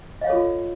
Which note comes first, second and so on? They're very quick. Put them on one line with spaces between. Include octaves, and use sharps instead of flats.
D#5 F5 C#5 A4 F4